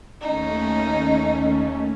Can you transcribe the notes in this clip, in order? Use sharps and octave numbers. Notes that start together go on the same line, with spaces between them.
D#2 A3 C#4 D#4